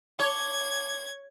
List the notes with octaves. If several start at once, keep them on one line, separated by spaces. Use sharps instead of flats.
C#5 A5 D6 G#6 G7